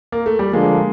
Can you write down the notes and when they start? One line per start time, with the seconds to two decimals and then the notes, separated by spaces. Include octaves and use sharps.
0.12 A#3
0.26 A3
0.39 G3
0.53 D3 F3 G#3 A#3 D4